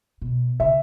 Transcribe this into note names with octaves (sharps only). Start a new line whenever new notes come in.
B2
C#3 E5